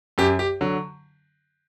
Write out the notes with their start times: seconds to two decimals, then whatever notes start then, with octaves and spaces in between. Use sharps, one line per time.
0.18 F#2 G4
0.39 G4
0.61 D3 F#3